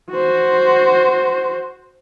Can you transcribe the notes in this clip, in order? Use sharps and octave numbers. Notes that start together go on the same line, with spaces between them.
F#4 C5